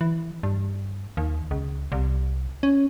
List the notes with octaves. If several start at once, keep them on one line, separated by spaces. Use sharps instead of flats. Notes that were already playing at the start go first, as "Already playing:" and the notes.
E3
G2
D#2
C#2
C2
C#4